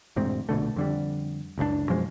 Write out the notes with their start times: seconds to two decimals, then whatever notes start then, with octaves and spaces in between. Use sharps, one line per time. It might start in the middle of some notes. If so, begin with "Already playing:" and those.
0.16 E1 D2 G#2 C4
0.49 A#1 B2 D3 A3
0.76 F2 D3 G3
1.58 F#1 C#2 B2 D4
1.89 F#2 B2 F3 G#3